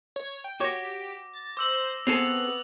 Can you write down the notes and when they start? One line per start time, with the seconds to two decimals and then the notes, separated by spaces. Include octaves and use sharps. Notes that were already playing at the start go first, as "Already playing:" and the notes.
0.16 C#5
0.44 G5
0.60 F#4 G4 C#5 D6 A#6
1.33 A6
1.57 C5 D6 E6 F#7
2.07 B3 C4 G#4 A4 F7